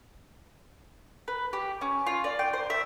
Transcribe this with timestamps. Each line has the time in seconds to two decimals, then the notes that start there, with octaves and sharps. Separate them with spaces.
1.28 B4
1.53 G4
1.81 C#4
2.07 F4
2.24 D5
2.39 G5
2.53 C5
2.70 E5